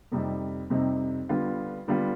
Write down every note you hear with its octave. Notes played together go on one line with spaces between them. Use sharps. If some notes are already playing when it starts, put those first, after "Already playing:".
F2 C3 G3 C4 D#4
F2 C3 G3 C4 D#4
D3 G3 B3 F4
D3 G3 B3 F4